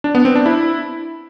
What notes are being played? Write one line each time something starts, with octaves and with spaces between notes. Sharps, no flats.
D4
B3
C4
D4
E4